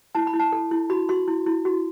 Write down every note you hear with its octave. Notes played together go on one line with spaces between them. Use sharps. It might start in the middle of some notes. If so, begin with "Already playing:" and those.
E4 A5
B5
E4
A5
A4
E4
F#4 B5
F#4 C6
E4
E4
F#4